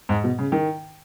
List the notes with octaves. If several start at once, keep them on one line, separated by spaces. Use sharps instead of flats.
G#2
B2
C#3
D#3